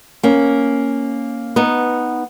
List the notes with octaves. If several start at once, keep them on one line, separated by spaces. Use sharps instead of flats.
A#3 C#4
B3 D#4